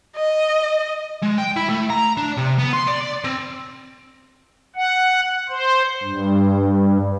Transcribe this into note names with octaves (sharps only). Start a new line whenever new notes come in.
D#5
G#3
G5
E4
A3
A#5
D4
C3
B3
C6
D5
C4
F#5
C5
G2